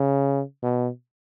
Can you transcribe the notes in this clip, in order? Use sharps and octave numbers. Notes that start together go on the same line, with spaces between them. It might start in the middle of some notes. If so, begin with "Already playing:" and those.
Already playing: C#3
B2